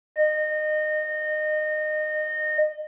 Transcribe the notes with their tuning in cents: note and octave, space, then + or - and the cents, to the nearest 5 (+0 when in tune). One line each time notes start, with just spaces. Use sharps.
D#5 -25